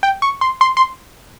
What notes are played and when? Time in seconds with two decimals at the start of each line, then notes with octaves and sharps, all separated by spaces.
0.03 G5
0.22 C#6
0.41 C6
0.61 C6
0.77 C6